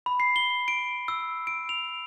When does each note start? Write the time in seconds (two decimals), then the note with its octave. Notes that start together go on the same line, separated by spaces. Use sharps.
0.06 B5
0.20 C7
0.36 G7
0.68 D7
1.08 E6
1.47 D7
1.69 F7